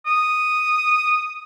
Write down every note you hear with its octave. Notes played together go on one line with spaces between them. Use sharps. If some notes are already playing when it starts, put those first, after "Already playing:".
D#6